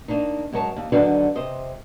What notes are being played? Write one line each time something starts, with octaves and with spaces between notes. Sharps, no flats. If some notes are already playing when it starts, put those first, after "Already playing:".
D#3 A#3 D4 D#4
F#2 G#3 A#4 C#5 A5
D#2
D3 D#3 F#3 D4 F#4 B4
C3 C5 D#5